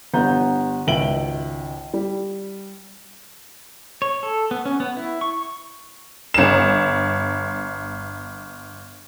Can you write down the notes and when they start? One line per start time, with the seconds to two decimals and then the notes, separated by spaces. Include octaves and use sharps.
0.14 G1 G2 B3 A#5 G6
0.87 G#1 C#2 E5 D7 F#7 G7
1.94 G3
4.02 C#5
4.23 A4
4.51 B3
4.66 C#4
4.80 B3
4.97 E4
5.21 C#6
6.34 G1 E7